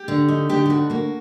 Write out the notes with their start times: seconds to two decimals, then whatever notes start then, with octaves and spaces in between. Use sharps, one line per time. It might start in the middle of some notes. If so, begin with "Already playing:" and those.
Already playing: G4
0.08 D3
0.28 D#4
0.49 D3 G4
0.66 G4
0.70 D2 F#4
0.90 A#3 F#4